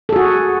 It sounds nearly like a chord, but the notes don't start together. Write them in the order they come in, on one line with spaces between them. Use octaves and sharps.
A4 G#4 F#4